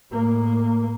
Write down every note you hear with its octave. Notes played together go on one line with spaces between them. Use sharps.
A2 A#3